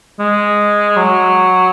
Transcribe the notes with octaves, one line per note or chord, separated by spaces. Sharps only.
G#3
F#3